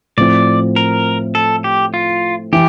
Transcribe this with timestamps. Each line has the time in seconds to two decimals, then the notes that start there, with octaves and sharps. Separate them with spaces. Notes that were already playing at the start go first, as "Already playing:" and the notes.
0.17 A2 F3 C4 D5
0.76 A#4
1.35 A4
1.64 G4
1.94 F4
2.52 E3 G4